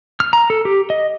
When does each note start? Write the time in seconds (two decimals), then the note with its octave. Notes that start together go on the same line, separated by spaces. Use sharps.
0.20 F6
0.33 A#5
0.50 A4
0.65 G4
0.90 D#5